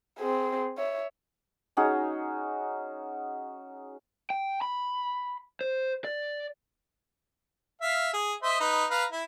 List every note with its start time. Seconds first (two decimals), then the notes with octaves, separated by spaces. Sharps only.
0.19 C4 G#4
0.78 C#5 E5
1.77 C#4 D#4 F#4 G#4
4.30 G5
4.62 B5
5.61 C5
6.05 D5
7.81 E5 F5
8.14 G#4
8.43 C5 D#5 E5
8.60 D#4 B4
8.91 B4 F5 A#5
9.12 E4